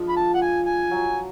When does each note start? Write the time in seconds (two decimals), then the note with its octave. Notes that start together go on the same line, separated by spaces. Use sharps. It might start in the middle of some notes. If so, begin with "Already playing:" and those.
Already playing: F3 G#3 D4 F4
0.09 B5
0.16 A5
0.34 F#5
0.42 G#5
0.66 G#5
0.91 F#3